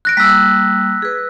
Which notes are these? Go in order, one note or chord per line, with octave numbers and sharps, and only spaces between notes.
F#6 A#6 D7
G3 A#3 E6 B6
G#4 B4